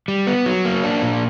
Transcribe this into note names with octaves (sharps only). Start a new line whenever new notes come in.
G3
B3
F#3
A#3
D4
A#2